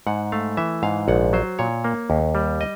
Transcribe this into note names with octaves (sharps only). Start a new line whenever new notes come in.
G#2 F#5
A3 F5
E3 E5
G#2 F5
A#1 F#5
F#3 C5
A#2 C#5
A#3
D#2
G3
D#5